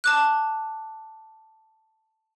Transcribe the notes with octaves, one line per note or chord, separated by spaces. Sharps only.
A5 D6 F#6